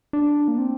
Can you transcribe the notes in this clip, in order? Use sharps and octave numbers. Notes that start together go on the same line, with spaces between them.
D4
A#3
C4